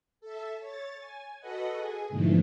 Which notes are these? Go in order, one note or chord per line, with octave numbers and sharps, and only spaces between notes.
A4 E5
C#5 A6
G#5
F#4 A4 B4 D#5 F#5
G#4 G#5
G#2 B2 D3 E3 F3 A3